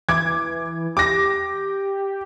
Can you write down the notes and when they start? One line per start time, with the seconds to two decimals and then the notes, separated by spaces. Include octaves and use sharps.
0.09 E3 D6 G#6
0.97 G4 D6 A#6